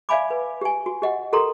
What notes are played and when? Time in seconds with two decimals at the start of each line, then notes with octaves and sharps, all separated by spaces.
0.09 D5 E5 F5 G#5 B5 D6
0.30 B4
0.61 G4 G#5
0.86 F#4
1.02 G4 D#5 F#5
1.33 G4 A4 A#4 A#5 C6